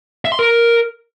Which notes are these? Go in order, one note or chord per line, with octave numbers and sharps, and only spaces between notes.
E5
C6
A#4